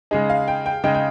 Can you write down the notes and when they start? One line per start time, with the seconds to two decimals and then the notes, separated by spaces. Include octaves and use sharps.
0.11 C#3 G#3 D#4 G#4
0.30 F5
0.48 G5
0.66 G5
0.84 C#3 G#3 D#4 G5
0.95 G5